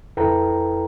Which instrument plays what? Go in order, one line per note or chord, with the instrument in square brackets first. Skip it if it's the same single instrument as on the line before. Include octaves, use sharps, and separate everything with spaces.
[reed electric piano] F2 E4 A4 B4 G5 A#5